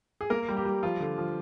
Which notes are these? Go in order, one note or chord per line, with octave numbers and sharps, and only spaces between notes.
G#4
A#3 A#4
G3
G4
G3
F3 F4
D3
F3